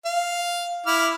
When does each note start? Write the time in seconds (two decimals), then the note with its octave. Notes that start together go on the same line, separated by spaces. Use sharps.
0.06 F5
0.86 E4 D6 F6